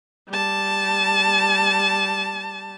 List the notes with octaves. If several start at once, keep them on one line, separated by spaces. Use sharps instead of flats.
G3 A5